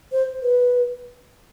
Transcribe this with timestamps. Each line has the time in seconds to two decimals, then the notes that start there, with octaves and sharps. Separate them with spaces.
0.12 C5
0.42 B4